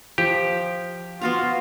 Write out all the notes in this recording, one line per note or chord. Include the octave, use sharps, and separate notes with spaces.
F3 G4
B3 F4 F#4 F5